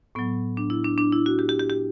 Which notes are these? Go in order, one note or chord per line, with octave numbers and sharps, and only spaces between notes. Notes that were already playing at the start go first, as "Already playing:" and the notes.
A2 F#3 B3
D4
E4
D4
D4
E4
F#4
G4
G4
G4
G4